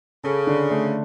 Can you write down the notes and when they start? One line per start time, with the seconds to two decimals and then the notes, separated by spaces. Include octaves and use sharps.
0.24 C#3 A4
0.47 D3
0.71 A3